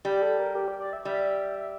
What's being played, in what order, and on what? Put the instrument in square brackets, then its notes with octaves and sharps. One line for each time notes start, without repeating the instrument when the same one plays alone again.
[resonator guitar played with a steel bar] G3 [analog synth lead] G4
[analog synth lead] A4
A#4
G4
D5
D5
E5
[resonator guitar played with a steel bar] G3 [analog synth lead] E5
[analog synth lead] E5